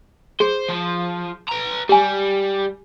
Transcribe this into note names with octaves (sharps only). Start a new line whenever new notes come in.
G#4 C5
F3
B4 A#5
G3 G4 G#5